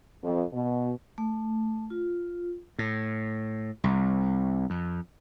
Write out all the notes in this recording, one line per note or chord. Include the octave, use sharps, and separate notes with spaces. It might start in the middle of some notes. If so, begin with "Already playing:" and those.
F2
B2
A3
F4
A2
C2
F2